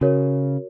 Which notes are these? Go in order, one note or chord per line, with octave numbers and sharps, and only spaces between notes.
C#3 F#4 A#4 C#5